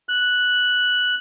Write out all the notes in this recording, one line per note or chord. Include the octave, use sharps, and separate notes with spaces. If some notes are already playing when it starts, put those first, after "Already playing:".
F#6